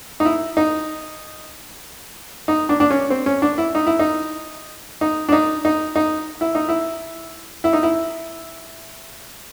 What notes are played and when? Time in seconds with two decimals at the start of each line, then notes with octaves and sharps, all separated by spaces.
0.20 D#4
0.25 E4
0.57 D#4
2.48 D#4
2.69 D4
2.80 D4
2.90 C#4
3.10 C4
3.26 C#4
3.42 D4
3.58 E4
3.75 D#4
3.87 E4
3.99 D#4
5.01 D#4
5.29 D4
5.32 D#4
5.65 D#4
5.96 D#4
6.41 E4
6.55 D#4
6.69 E4
7.64 E4
7.73 D#4
7.83 E4